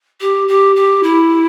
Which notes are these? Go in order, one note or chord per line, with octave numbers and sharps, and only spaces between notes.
G4
G4
G4
E4